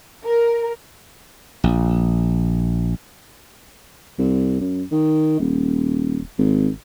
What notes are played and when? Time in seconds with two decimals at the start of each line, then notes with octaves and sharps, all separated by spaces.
0.23 A#4
1.64 A#1
4.19 C2
4.61 F#2
4.92 D#3
5.40 D#1
6.38 G#1